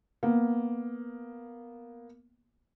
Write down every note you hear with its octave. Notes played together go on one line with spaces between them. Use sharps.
A#3 B3